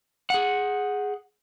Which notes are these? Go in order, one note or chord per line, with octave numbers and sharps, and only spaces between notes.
G#4 F#5